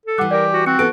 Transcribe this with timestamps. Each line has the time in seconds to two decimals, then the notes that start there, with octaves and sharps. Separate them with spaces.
0.06 A4
0.18 E3 G3 F#5 D6 F#6
0.31 G4 A#4 D5
0.53 F#4
0.66 C4 F#4 C#7
0.79 E3 B3 A4 D7